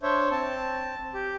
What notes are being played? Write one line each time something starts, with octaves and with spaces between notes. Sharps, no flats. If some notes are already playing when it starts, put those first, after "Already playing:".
D4 C5 C#5 E5
C4 A5
G4